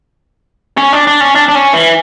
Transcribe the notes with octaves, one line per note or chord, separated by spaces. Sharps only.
C#4
D4
D4
C#4
D4
D4
C#4
E3